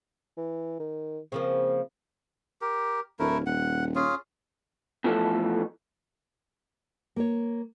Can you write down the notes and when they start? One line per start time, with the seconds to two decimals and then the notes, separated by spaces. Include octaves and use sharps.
0.37 E3
0.80 D#3
1.32 C#3 F3 A#3 C4
2.61 G4 A#4
3.19 D1 A3 E4 A#4
3.46 D#1 F#5
3.95 C#4 F4 G#4
5.04 B2 E3 F3 A3 A4
7.16 A#3 C#5